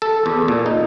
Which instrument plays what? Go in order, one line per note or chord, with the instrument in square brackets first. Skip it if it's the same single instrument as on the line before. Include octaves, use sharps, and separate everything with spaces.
[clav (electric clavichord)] A4
E2
A#2
D#4